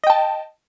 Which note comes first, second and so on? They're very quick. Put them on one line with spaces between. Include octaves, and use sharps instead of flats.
D#5 G5 A5